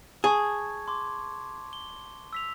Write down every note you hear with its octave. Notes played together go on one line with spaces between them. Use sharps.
G#4 A5 C#6 G#6
C6 D6
G7
E6 B6 F7